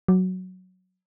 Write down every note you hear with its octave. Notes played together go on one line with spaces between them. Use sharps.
F#3